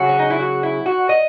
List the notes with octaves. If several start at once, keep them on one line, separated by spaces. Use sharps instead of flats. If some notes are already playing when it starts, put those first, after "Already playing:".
Already playing: C#3 F#3 F#4
C#4
D#4
E4
F#4
E4
F#4
D#5